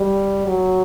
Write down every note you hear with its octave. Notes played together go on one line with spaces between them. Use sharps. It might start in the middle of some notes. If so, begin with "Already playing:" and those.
Already playing: G3
F#3